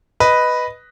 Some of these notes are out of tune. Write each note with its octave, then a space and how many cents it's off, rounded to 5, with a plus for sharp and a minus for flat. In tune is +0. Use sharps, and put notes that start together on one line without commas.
B4 +0 D#5 +0